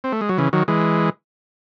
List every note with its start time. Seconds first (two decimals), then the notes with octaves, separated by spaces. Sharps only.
0.04 C4
0.12 A3
0.21 G#3
0.29 F#3
0.38 C#3 E3
0.53 D#3 F#3
0.68 E3 G#3